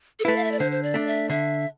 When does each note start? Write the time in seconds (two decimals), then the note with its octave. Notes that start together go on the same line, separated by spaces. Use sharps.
0.20 A4
0.25 A3 E4 B4
0.36 F5
0.44 E5
0.52 D5
0.59 D3 C5
0.71 C5
0.83 D5
0.94 A3 D4
1.07 E5
1.30 D3 E5